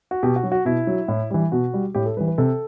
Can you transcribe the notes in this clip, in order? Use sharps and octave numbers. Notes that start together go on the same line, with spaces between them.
F#4
B2 G4
F#4
F#3
F#4
B2 E4
F#3
A2
E3 G3
B2 F#4
G3
A2 G4
A4
E3 G3 B4
B4
C3 A4